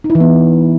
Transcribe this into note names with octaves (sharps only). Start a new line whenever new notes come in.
D#4
E4
E3
B3